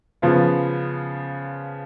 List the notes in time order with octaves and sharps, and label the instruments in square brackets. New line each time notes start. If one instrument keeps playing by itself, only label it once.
[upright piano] C#3 F3 B3 F4